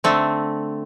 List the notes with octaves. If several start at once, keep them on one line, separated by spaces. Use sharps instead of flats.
D3 A3 C4